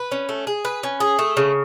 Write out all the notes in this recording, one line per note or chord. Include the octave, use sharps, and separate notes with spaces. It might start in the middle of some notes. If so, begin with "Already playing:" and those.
Already playing: B4
C#4
A3
G#4
B4
C#4
G#4
A3
C#3